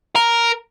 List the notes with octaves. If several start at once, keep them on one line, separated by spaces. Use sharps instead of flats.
A#4